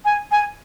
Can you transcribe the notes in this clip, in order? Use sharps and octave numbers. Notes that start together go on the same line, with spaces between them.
G#5
G#5